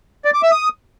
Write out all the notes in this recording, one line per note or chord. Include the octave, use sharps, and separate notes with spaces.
D5
D6
E5
D#6